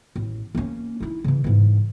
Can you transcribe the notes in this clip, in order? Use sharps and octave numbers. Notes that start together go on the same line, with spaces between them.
A1
A#3 C#4
D#4 E4
C#3 E3
G#2 E3